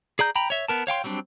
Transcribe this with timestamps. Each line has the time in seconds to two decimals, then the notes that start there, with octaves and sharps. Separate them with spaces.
0.19 G#4 D5 A#5 G6
0.36 G5 A#5 B5
0.50 C#5 E5
0.68 B3 A#4 A5
0.87 C#5 F5 G5 C6
1.04 F#3 G3 C4 D4